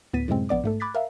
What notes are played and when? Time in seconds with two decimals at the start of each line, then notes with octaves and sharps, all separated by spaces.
0.13 D2 A2 B3 A6 B6 D#7
0.28 F#2 A2 C3 G#3 C4
0.49 A#1 B3 D5 D6
0.64 G#2 A3 A4
0.80 B5 D6 F#6 G#6 A6 B6
0.95 A#4 E5 F5